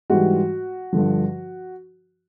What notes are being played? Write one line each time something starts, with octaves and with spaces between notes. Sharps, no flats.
G#2 E3 G3 F#4
G2 D3 F3